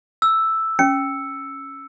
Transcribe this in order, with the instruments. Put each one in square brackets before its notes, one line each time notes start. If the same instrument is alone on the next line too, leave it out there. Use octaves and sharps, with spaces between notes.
[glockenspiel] E6
[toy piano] C#4 [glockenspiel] C#7